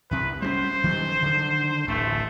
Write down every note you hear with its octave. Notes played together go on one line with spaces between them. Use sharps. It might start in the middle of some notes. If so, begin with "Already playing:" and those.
C2 C3 B4
G3 G#3 C#4 C5
D#3 F#3 G3
D3 D#3
D1 A1 A3